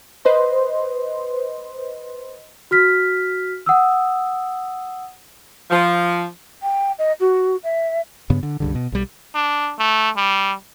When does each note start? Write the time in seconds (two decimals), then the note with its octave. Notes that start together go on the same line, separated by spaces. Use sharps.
0.25 B4 C5 D#5 C6
2.71 F#4 F6 B6
3.66 F#5 D#6 E6
5.71 F3
6.62 G5
6.99 D#5
7.20 F#4
7.63 E5
8.30 G2 C#3 B3
8.43 D3
8.60 C#2 G2 D3
8.75 B2
8.92 B1 G3
9.35 D4
9.79 A3
10.17 G3